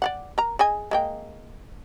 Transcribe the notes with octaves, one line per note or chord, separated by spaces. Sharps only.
D5 F5 F#5
A#4 A#5
G#4 D#5 G#5
G#3 A#3 G5